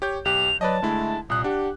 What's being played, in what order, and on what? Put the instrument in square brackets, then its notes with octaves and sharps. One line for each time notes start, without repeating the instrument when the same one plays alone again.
[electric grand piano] G4 C#5 G6
[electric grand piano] B1 G4 F#6 [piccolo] F7
[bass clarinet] F#3 [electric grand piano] B4 D5 D#5 [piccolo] A5
[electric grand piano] D3 G#3 E4 [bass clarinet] A3
[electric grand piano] C2 F#6 [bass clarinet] A#2 [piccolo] D#6
[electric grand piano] D4 [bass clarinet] G4 [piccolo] F#5